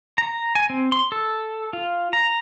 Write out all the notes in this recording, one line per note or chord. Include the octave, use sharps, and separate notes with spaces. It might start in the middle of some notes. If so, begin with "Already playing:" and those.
A#5
G#5
C4
C6
A4
F4
A#5